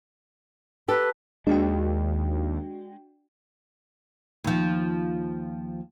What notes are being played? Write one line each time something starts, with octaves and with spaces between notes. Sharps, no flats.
G4 A4 B4
D#2 G#3 D4 F#4 G5
D#2 F3